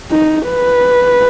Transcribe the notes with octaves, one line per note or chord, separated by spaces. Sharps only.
D#4
B4